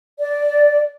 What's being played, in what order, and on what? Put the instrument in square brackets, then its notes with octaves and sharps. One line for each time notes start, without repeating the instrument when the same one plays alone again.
[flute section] D5